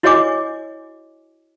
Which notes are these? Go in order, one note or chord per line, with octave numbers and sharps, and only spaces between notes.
E4 F#4 C#5 D#5 G#5 D6